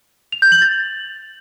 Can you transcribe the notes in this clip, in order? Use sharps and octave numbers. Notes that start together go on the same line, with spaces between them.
F7
G6
F#7
A6